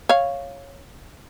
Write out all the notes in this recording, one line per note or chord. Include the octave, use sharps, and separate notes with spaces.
C#5 F5